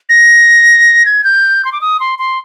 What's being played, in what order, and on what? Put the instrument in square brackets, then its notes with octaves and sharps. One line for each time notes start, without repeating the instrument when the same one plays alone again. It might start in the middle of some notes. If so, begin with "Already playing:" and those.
[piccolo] A#6
G#6
G6
C6
D6
D#6
C6
C6